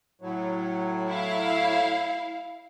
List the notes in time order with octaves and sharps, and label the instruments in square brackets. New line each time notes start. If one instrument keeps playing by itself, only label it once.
[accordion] A2 F#3
[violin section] E4 F5